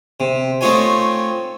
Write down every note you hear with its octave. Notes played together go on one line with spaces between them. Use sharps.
C3
A3 C4 D#4 F4 C#5 G#5